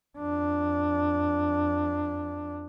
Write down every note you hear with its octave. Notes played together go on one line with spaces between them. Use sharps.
F2 D4